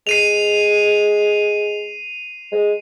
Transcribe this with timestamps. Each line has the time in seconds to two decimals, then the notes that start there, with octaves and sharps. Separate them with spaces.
0.07 G#3 C7 D#7 F7
2.52 G#3